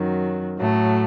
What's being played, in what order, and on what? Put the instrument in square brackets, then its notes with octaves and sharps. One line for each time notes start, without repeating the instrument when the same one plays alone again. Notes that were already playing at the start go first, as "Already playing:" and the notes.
Already playing: [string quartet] F#2 D#3 F#3
A2 F#3 A3